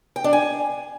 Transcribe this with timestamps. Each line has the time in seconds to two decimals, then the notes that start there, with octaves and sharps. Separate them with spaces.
0.16 G5
0.24 D4
0.33 G#5